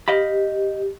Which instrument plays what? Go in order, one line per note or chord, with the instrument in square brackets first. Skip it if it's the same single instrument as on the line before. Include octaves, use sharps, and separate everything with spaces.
[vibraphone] G4 [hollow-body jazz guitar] D#5 F5 B5